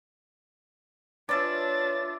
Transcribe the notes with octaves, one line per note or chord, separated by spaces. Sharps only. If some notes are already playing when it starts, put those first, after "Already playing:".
C#4 D4 F4 B4 D5 E5 A6